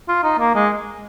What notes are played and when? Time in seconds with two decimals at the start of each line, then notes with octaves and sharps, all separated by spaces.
0.08 F4
0.23 D#4
0.39 A#3
0.55 G#3